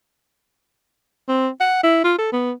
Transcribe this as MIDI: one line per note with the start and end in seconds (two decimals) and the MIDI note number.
1.28 1.48 60
1.61 1.78 78
1.83 1.99 64
2.04 2.14 65
2.18 2.32 69
2.32 2.52 59